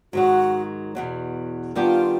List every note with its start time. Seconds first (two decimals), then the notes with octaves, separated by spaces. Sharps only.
0.13 G#2 D#3 F#3 F#4
0.95 E2 B2 F#3
1.75 D#3 G3 B3 D4 F4 G4